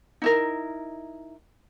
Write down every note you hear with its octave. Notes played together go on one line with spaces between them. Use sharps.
D#4 E4 A#4